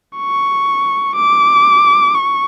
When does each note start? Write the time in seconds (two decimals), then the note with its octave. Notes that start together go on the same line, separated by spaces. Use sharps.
0.17 C#6
1.15 D6
2.14 C#6